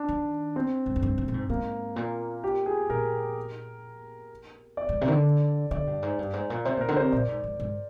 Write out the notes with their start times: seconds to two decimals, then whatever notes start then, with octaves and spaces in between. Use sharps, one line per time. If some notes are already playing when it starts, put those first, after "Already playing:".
Already playing: D4
0.08 D#3
0.56 C4
0.86 G#2
0.96 F2
1.03 G2
1.18 G2
1.28 A#2
1.34 G#2
1.49 G#2 A#3
1.96 A#2
2.44 G4
2.66 G#4
2.90 A#2 A#4
4.77 D5
4.89 G#2
5.01 C3
5.08 D#3
5.13 D3
5.71 D3 D5
5.87 G2
6.02 G#2
6.19 G2
6.33 G#2
6.50 A#2
6.65 C3 C5
6.77 A#2 A#4
6.89 D3
6.97 C3 C5
7.12 A#2 D5
7.28 G#2
7.44 G#2
7.60 G#2